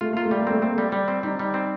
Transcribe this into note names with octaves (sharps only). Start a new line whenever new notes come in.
A3 F4
A#3 F4
A3
G3
A#3
A3 C4
A#3 C4
G3 A3
G3
C4
G3 D#4
G3
C4